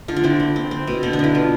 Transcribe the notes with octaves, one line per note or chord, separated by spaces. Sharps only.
D3 F4
D4
C4 E4
C4
C4
C4
B2
D3 C4
D4
B3 E4
B3 F4